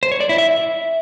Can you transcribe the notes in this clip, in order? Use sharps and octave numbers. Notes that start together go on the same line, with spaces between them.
C5
C#5
D5
E4
E5